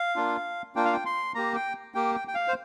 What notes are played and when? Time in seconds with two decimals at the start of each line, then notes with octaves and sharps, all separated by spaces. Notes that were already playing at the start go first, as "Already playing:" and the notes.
Already playing: F5
0.16 A#3 D4 F4
0.75 A#3 D4 F4 G5
0.85 F5
0.93 G5
1.06 C6
1.35 A#3 G4 A#5
1.55 G5
1.95 A#3 G4 G5
2.15 G5
2.28 G5
2.35 F5
2.48 C5